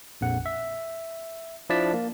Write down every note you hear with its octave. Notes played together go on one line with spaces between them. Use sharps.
A#1 F2 F#5
E5
F3 D4 E4 D5 A5 B6
A#3